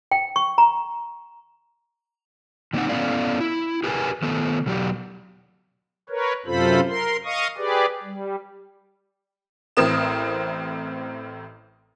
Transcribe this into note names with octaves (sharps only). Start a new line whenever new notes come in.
G5
C#6
A#5
D#3 G#3 A#3 C4 D#4 F#5
B3 C#4 E4 A4 D5 F5
E4
G4 G#4 A#4 B4 G5 G#5
D#3 A3 B3 A4
B2 F#3 G4
A#4 B4 C#5
F#2 C3 F4 A4 C5 B5
A#4 C6
D#5 F5 C#6 D#6
G4 G#4 B4 D5
G3
A1 A2 C4 A#4 D#6 E7